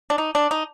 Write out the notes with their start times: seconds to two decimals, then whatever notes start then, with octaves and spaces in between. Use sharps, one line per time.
0.10 D4
0.18 D#4
0.35 D4
0.51 D#4